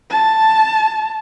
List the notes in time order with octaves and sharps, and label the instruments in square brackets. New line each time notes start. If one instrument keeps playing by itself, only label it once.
[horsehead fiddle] A5